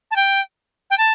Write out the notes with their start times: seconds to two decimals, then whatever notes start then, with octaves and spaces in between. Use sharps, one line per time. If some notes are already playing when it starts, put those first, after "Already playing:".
0.11 A5
0.16 G5
0.90 G5
0.98 A5